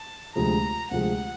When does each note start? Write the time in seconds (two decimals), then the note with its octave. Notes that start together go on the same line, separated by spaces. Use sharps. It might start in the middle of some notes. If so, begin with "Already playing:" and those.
Already playing: A5
0.35 D2 C3 F3 G#3 A#5
0.91 D2 C3 F3 G#3 F#5